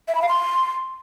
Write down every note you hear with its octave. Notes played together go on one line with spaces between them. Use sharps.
E5
B5
F5
C6